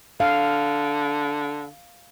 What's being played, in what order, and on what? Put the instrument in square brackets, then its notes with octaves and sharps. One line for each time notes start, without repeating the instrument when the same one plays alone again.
[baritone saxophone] D3 [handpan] F5